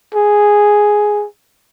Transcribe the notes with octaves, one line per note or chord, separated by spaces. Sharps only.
G#4